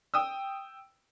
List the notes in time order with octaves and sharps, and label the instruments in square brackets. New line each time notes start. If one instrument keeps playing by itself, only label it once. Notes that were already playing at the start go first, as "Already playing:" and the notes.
[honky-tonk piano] G5 D#6 E6